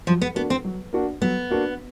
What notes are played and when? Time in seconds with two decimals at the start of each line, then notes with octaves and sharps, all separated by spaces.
0.07 F3 F#3
0.21 B3
0.35 A#3 B3 D4 F#4
0.50 C4
0.65 F#3
0.93 A#3 D4 F#4
1.21 F#3 B3
1.51 A#3 D4 F#4